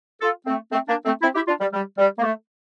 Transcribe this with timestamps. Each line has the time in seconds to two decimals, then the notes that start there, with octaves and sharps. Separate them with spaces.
0.21 F4 A4
0.46 A3 C4
0.72 A3 C4
0.88 A#3 D4
1.05 A3 C4
1.22 C4 E4
1.35 E4 G4
1.48 D4 F4
1.60 G3
1.73 G3
1.98 G3
2.18 A#3
2.24 A3